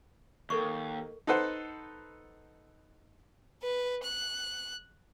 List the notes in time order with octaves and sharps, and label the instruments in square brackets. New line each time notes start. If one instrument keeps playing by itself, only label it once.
[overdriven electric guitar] D#2 [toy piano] A4 A#4 C#6
[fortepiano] D#4 A4 B4 C5 F#5
[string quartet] B4
F#6